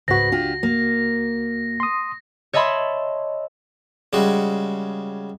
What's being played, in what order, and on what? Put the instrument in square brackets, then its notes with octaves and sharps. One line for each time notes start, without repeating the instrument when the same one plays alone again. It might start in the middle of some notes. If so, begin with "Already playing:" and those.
[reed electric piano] C#2 F#4 [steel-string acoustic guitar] G#2 B4 [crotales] A#6
[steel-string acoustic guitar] D4 F4 G4
A#3
[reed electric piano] C6 D#6
[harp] C#5 D#5 E5 A5 B5 C6
[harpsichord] C#3 G3 G#3 F#4